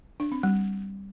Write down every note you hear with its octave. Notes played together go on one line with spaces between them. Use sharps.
D4
C4
G3